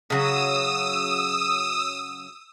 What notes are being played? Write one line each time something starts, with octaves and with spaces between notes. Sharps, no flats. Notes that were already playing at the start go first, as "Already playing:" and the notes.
C#3 F#3 D#6 E6